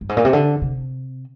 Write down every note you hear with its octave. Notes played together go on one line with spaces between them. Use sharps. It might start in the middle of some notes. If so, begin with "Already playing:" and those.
G2
G#2
A#2
C3
D3
C3